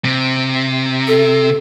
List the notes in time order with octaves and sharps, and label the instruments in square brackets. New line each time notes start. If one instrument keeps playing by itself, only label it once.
[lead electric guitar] C3
[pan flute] A4